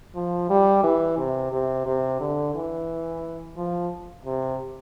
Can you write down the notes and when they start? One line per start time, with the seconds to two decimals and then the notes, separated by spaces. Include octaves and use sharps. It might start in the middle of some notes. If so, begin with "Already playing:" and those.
0.15 F3
0.50 G3
0.83 E3
1.18 C3
1.52 C3
1.86 C3
2.20 D3
2.55 E3
3.57 F3
4.25 C3